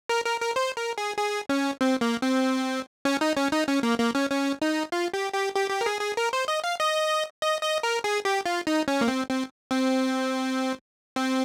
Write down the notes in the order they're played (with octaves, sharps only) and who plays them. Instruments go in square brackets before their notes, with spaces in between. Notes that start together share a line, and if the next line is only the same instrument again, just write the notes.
[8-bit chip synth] A#4
A#4
A#4
C5
A#4
G#4
G#4
C#4
C4
A#3
C4
C#4
D#4
C#4
D#4
C#4
A#3
A#3
C#4
C#4
D#4
F4
G4
G4
G4
G4
A#4
G#4
G#4
A#4
C5
D#5
F5
D#5
D#5
D#5
A#4
G#4
G4
F4
D#4
C#4
A#3
C4
C4
C4
C4